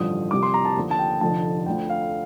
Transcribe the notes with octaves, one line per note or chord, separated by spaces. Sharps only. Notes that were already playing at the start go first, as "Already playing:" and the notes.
Already playing: A1 G2 D3 F3 D#6
C2 C3 F3 D6
C6
A#5
A5
D#2 D3 F3
A5
G5
F1 F2 D3 F3 A5
D2 D3 F3 G5
F5